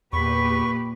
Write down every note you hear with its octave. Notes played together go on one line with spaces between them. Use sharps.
E2 A#2 G4 B4 B5 C#6